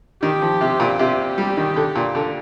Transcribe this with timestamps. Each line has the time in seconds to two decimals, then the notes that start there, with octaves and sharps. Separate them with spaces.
0.22 D#3 G4
0.41 F3
0.61 C3
0.80 A#2
0.99 C3 G4
1.38 G3
1.57 D#3
1.76 D3
1.95 A#2
2.15 D3